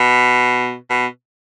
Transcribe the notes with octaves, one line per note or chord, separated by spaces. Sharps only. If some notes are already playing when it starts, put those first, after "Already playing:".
Already playing: B2
B2